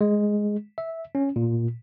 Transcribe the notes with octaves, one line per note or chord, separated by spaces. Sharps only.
G#3
E5
C#4
A#2